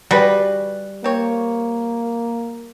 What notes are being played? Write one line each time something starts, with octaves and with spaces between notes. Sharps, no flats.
G3 F#4 G#4 B4
A#3 C4 C#5